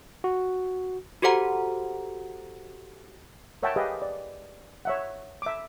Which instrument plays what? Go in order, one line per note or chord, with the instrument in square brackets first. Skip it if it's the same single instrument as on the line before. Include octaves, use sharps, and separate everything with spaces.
[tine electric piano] F#4
[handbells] F#4 G4 A4 C5 F#5 A#5
[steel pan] A#4 C#5 E5 F#5 G5 A5
G4 G#4 B4 D#5 F5
D5
C#5 E5 F#5
E5 D6